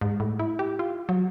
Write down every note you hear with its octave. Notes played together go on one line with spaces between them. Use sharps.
G#2
A2
E4
G4
F4
F#3